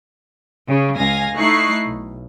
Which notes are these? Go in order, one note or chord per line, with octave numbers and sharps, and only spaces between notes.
C#3
C#2 F5 G#5 A#6
A3 D#4 E4 C#6 F#6 C7
B1